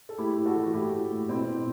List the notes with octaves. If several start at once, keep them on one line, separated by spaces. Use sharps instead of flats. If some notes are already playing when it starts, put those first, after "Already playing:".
A4
A3 E4 G4
A2
F#4 A4
E3
F#4
A2 E4 G4
A2
A2
B2 C4 E4
B2